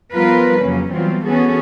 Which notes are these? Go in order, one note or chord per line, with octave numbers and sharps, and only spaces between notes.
F3 G3 B3 F4 A#4 B4
F2 C#3 F#3 A#3 C#4
E3 F#3 G3 B3 C4 F4
E3 B3 C#4 F#4 G#4 A4